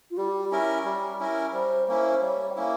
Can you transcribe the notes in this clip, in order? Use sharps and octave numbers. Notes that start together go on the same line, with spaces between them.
F4
G3 G4
C#4 E4 A#4
G3
C#4 E4 A#4
G3 C5
A#3 C#4 E4 C5
G3 C#5
G5
A#3 C#4 E4 F5